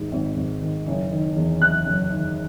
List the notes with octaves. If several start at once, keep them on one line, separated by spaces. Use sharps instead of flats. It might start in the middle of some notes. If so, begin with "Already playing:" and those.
Already playing: G#1 G#2 D#3
G#1
G#1
D#3
F#1
D#3
E2
F#1 F#6
F#1
D#3